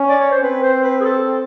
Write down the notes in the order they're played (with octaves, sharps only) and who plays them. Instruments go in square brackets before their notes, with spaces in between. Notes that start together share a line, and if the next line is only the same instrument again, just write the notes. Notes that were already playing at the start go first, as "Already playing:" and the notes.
Already playing: [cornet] C#4
[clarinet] D5
C#5
C5
[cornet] C4 [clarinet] B4
[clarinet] C5
B4
G#4
A4